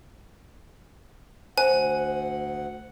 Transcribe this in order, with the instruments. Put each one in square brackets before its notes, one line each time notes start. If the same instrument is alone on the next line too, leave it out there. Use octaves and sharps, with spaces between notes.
[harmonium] D2 F#5 [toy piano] C5 [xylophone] G#5